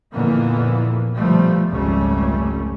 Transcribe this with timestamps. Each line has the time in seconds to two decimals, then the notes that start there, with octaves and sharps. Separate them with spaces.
0.14 F2 A#2 D3 E3 A#3 B3
1.17 G1 B2 F3 G3 A3
1.69 F1 C#2 G#2 G3 A3 C#4